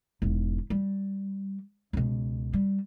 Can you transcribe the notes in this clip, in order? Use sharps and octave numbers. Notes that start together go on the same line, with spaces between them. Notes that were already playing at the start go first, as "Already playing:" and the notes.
E1 G#2
G3
C#2 B2
G3